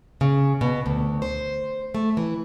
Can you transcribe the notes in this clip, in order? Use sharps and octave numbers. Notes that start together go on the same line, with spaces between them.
C#3
B2
D2
C5
A3
E3